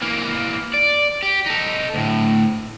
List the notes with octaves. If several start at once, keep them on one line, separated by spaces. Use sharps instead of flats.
E3 A#3
D5
G4
D#4 A4
D2 A2